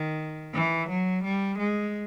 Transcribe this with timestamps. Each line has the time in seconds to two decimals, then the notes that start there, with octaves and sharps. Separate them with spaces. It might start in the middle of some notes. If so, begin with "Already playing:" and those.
Already playing: D#3
0.54 E3
0.89 F#3
1.24 G3
1.59 G#3